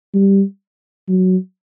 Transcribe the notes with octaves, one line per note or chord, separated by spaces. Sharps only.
G3
F#3